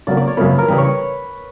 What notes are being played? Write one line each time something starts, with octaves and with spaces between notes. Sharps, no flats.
C#3 F#3 A#3 D5
D5
C#5
F#2 C#3 F3 A#3 B4
A#4
C#3 E3 G3 B4
C#5